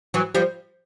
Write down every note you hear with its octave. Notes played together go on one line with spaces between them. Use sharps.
E3 F#3
F3 G3